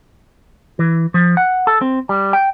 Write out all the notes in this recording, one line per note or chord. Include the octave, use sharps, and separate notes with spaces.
E3
F3
F#5
A4
C4
G3
G5